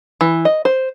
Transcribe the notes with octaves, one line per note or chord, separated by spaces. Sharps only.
E3
D#5
C5